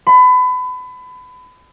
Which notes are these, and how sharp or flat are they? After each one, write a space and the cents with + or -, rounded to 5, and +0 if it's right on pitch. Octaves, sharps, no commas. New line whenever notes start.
B5 +30